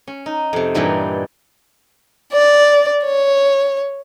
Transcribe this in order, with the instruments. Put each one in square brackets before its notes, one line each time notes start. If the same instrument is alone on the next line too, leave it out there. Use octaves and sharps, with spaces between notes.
[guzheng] C#4
D#4
F2 C3
G2 A#2 E3 G3 D#4
[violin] D5
C#5